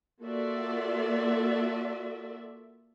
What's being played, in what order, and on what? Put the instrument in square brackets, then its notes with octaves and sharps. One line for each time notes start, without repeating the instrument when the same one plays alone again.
[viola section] A#3 F4 F#4 A4 D5 E5